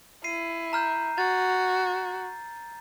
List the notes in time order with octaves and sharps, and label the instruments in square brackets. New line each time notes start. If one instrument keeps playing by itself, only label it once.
[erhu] E4 [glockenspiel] C7 D#7
[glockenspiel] A#5 F6 G6
[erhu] F#4 [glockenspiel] A6